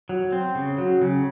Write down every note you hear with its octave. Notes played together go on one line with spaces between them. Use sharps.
F#3
C4
C#3
F#3
C#3